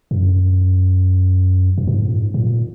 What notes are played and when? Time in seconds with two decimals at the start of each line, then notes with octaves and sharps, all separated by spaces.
0.11 F#2
1.78 F#2
1.87 G#2
2.06 A#2
2.13 G#2
2.34 G#2
2.39 A#2